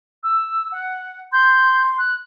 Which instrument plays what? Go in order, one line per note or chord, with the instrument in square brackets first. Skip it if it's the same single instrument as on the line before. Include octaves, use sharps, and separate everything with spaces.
[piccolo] E6
F#5
[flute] C6 [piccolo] G6
[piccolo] F#6